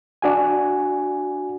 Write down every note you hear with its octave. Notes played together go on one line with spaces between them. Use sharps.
D4 F#4 G#5